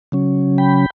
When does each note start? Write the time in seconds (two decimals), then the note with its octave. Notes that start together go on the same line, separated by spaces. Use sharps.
0.12 C#3 F#3 C#4
0.58 G5 B5